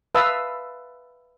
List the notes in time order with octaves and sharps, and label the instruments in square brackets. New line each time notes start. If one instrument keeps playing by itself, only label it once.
[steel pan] B4 E5 F5 A5 D#6 E6